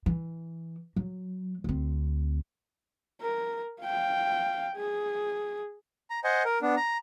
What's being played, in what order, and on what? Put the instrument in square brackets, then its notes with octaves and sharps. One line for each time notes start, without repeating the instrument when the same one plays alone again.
[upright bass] E3
F#3
D2 C4
[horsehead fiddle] A#4
F5 G5
G#4
[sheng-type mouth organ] A#5
C5 D#5 F#5 G#5
A#4
B3 D4
A#5